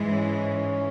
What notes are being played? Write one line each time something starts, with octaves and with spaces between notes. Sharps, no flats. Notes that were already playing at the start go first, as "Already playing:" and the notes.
Already playing: G#2 E3 G#3
C#4